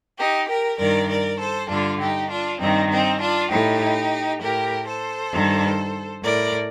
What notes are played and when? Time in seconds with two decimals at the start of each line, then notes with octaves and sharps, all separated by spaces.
0.18 D#4 G4
0.49 G4 A#4
0.79 G2 D#3 A#4 D5
1.09 A#4 D5
1.39 A4 C5
1.69 G2 D3 D4 F4
2.00 D#4 G4
2.30 D4 F4
2.60 G2 D#3 C4 D#4
2.90 C4 D#4
3.20 D4 F4
3.50 A2 D#4 G4
4.41 A2 G4 A#4
4.87 A4 C5
5.32 G2 D#3
6.23 A2 A#4 D5